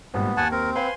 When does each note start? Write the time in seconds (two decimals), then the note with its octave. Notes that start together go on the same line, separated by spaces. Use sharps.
0.14 G#1 G2 A#2 B3
0.37 D#2 F#5 G#5 A5
0.52 C4 A#4
0.75 B4 C5 F5 G#5 C6